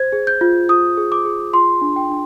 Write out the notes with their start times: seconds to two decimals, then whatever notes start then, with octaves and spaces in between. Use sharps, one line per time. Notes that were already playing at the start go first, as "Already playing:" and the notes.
Already playing: C5 G#6
0.13 G#4
0.27 G6
0.41 F4
0.69 F4 D#6
0.97 G#4
1.12 D6
1.25 G#4
1.54 F4 C6
1.81 D4
1.96 G5
2.10 D4